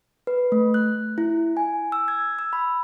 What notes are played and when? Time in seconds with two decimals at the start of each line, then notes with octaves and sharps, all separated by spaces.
0.27 B4
0.52 A3
0.74 F#6
1.18 E4
1.57 G#5
1.92 E6
2.08 G#6
2.39 E6
2.53 B5